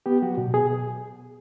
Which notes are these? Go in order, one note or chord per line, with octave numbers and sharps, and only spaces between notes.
B3 G4
F#3 F#4
B2
B2 G#4